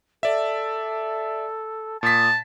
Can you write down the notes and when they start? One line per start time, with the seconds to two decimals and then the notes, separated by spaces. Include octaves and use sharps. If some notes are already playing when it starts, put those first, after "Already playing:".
0.23 A4 D5 E5
2.03 A#2 A5 D#6 B6